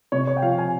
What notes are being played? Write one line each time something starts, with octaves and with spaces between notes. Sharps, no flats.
C3 C#5
C#5
G5
F3 F5
G#5